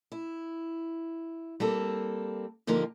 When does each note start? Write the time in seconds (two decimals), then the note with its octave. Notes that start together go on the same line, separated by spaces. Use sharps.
0.12 E4
1.60 G3 A#3 C4 A4
2.67 G#2 D3 F3 A#3 G4 A#4